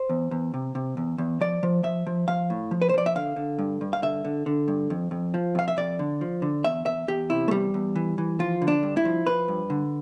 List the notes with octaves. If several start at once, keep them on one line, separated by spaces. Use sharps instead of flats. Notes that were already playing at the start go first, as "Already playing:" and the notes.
Already playing: C5
E2
E2
C3
C3
E2
E2
F3 D5
F3
F3 E5
F3
F3 F5
A2
F3
B4
C5
F3 D5
E5
D3 F5
D3
G2
G2
F5
D3 E5
D3
D3
G2
F2
F2
F3
F2 F5
E5
F2 D5
D3
F3
D3
E2 E5
E2 E5
E2 G4
C3 E4
A3
E2 G3
E2
E3
E3
F3 F4
D3
D4
G2
E4
F3
F3 B4
G2
D3